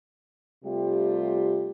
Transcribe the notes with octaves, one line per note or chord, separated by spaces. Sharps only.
C3 G3 A3 F4 G4